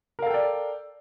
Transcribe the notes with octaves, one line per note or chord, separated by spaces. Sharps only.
A4 A#4 D5 F5 G5